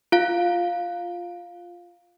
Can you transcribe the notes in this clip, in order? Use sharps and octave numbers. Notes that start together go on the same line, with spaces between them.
F4 F5